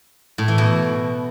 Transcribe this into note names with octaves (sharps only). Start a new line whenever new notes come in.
A2
E3
B2